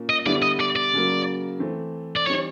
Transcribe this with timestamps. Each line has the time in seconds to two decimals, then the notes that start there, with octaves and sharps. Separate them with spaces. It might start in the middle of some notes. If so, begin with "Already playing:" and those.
Already playing: A#2 A#3 C#4
0.10 D#5
0.26 D3 G3 B3 E4 D5
0.42 D#5
0.60 D5
0.76 D5
0.93 C#3 F#3 A#3
1.60 E3 A3 C4
2.16 D5
2.26 E3 G3 C4 D#4 C#5